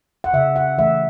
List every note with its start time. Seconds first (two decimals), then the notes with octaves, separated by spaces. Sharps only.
0.24 F#5
0.33 C#3 E5
0.56 F#5
0.78 E3 A3 E5